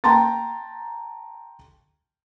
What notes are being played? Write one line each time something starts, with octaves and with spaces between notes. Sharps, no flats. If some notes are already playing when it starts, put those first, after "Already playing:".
G5 A5 A#5 C6 A6